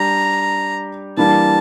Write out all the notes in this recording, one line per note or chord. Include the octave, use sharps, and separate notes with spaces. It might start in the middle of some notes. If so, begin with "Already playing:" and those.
Already playing: G3 D4 G4 A#5
E3 G3 A#3 D4 A5